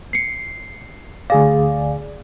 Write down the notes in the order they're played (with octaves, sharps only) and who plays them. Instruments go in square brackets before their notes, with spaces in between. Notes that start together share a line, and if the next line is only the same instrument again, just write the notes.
[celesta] C7 C#7
[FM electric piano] D2 G#4 D5 [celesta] F5